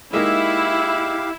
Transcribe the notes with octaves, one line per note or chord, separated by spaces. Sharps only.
G#3 A#3 D#4 E4 G4 E5 F5